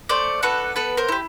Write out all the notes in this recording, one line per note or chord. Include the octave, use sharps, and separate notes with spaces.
A3 C5 D5
D4 F#4 A4 B4
B3 A4 B4
A#4 C5
E4 G4